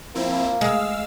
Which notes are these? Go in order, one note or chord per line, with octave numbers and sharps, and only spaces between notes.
F3 A#3 C4 E4
G#3 F5 E6